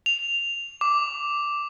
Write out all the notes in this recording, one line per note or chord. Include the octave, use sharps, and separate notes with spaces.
F7
D6